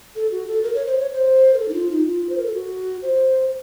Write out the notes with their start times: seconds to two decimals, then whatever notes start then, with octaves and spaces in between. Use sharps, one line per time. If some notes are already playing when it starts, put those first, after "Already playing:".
0.16 A4
0.31 F#4
0.48 A4
0.63 A#4
0.75 C#5
0.86 C5
0.99 C#5
1.11 C5
1.54 A#4
1.59 A4
1.69 D#4
1.74 F4
1.91 D#4
2.06 F4
2.29 C5
2.38 A#4
2.46 A4
2.54 F#4
3.02 C5